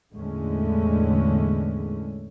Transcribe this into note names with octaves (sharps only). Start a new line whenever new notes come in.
E2 A2 D3 G#3 A3 C#4